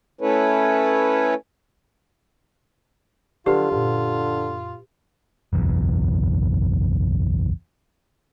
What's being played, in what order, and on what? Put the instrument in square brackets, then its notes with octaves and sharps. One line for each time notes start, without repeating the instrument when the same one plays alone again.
[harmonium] A3 C#4 E4 A4 B4 C#5
[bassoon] D3 [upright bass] F3 F#3 [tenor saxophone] F4 [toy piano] G4 B4
[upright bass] F#2 A#2 [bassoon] D3
[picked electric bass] F#1 B1 E2